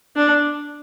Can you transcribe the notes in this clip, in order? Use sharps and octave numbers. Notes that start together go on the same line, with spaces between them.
D4